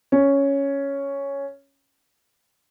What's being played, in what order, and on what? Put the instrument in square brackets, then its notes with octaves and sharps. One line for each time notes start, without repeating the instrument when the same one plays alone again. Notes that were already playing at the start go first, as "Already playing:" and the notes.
[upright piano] C#4